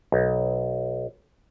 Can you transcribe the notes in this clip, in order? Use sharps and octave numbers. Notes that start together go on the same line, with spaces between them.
B1